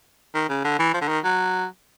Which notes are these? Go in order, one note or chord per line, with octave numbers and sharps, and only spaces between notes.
D#3
C#3
D3
E3
F3
D3
D#3
F#3